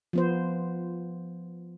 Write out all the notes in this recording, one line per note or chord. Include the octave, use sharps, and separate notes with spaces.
F3 B3 C5